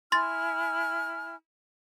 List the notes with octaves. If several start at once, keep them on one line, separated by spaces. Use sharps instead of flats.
E4 G#5 C6 F6 A6